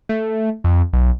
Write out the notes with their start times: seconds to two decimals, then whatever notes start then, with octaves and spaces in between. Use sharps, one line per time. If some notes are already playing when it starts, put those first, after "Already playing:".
0.09 A3
0.64 F2
0.93 B1